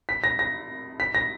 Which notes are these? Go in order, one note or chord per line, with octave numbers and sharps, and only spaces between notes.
B6
A#6
A#6
B6
A#6